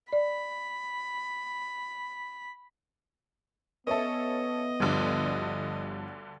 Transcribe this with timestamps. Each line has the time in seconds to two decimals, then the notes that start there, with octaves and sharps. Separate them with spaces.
0.13 D5 B5
3.87 B3 C#4 A4 B4 D#5 E5
4.80 G1 D2 G2 D3 F3